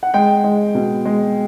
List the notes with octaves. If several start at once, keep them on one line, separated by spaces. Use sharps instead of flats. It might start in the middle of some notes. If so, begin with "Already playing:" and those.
F#5
G#3 G5
G#3
B2
G#3